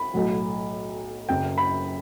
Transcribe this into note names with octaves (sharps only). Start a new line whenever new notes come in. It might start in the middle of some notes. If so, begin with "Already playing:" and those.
Already playing: B5
B1 A2 F#3
F#1 F#2 C#3 G5
B5